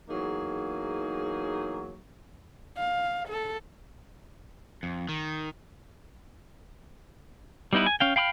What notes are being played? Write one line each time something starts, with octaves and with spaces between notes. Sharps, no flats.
E2 F#3 A#3 D#4 G#4
F5
A4
F2
D#3
G3 B3 D#4 E4 B4
G#5
C#4 F5 G5
F5 G5 B5 D6 F6